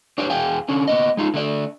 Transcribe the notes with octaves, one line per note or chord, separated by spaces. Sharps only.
D4 G4 B4 C#5 D5
E2 G#4 F5 G5 G#5
D3 C#4 D4
A#3 B3 D#5
G#3 D#4 F4
D3 A3 D5